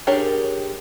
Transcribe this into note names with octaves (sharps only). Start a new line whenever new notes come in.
D4 G4 G#4 A#4 C#5